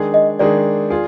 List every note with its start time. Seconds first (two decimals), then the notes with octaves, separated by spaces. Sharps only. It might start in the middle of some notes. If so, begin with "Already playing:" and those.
Already playing: D#3 G#3 D4 G#4
0.14 D#5
0.39 D#3 G#3 D4 G#4 D5
0.90 F4 G#4